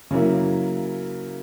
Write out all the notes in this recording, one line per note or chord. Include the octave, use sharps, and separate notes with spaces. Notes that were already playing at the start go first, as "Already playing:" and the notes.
C#3 F#3 A#3 E4